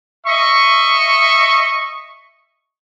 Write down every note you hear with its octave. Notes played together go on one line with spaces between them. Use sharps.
D#5 E5 C#6